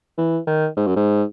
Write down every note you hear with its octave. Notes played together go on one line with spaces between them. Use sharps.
E3
D#3
G#2
F#2
G#2